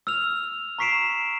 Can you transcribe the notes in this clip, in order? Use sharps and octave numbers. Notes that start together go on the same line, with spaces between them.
E6 F6 F7
A#5 C#6 B6 C7 D7 E7